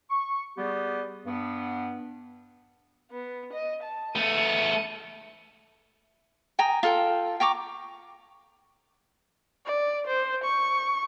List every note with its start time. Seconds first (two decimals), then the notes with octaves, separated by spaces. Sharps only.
0.10 C#6
0.57 G3 B3 G4 G#4
1.26 G2 B3
3.11 B3
3.53 D#5
3.83 A5
4.16 A3 B3 C#7 D#7
6.59 G5 G#5 A#5 D#6
6.83 F4 A4 G5
7.40 G5 A#5 C#6 D6
9.66 D5
10.07 C5
10.44 C#6